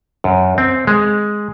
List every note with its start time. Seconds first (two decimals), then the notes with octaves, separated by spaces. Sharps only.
0.24 F#2
0.58 C4
0.87 G#3